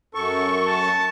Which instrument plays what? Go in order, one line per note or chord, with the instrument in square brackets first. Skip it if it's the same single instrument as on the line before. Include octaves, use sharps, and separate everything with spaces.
[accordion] F#2 C#6 [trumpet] A4
[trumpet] A5